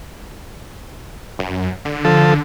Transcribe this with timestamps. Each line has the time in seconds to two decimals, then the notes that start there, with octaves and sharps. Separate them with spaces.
1.39 F#2
1.85 D3
2.05 F3 A4
2.27 D3